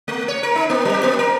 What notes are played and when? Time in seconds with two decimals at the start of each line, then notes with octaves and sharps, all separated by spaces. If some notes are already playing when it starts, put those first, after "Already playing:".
0.08 A3
0.28 C#5
0.43 A#4
0.55 D#4
0.70 A#3
0.85 F#3
1.03 A#3
1.19 A#4